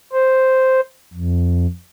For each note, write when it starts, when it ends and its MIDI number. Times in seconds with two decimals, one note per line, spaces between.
0.13 0.80 72
1.14 1.67 41